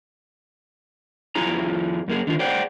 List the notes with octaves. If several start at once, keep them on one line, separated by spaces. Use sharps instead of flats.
F2 F3 E4 G#4 A#5
F#2 A#3 G#4
D3 D#3 F4
G#4 C5 D5 F#5 G5